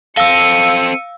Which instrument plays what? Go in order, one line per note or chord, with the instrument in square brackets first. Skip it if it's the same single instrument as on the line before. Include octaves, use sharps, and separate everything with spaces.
[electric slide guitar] C4 A4 [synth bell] F5 E6 [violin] C#7 D#7